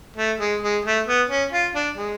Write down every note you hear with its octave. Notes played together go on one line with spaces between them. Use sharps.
A3
G#3
G#3
A3
B3
C#4
F4
D4
G#3